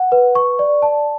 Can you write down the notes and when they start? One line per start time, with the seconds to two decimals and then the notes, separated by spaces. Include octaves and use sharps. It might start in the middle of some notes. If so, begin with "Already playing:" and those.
Already playing: F#5
0.12 B4
0.35 C#6
0.59 D5
0.82 A5